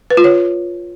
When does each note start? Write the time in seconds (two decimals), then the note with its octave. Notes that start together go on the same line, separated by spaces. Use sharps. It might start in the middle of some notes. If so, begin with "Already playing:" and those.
0.10 B4
0.17 F4
0.24 C#5